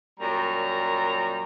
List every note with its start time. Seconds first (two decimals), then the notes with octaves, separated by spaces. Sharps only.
0.20 F#2 A#2 G3 C#5 A#5